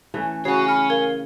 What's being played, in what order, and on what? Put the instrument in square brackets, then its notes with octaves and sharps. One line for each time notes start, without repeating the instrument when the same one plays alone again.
[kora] E3 A3 C#4
[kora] C#3 [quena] F#4 [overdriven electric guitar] C#5 G#5 [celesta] C7
[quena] B5 [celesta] F6 C#7
[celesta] A#4 G#6 G7 [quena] F5